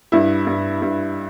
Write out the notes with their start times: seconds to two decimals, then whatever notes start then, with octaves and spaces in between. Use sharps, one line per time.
0.12 G2 E4
0.47 G2
0.82 G2